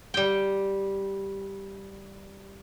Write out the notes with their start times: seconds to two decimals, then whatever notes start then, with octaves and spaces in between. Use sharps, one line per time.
0.14 G3 G5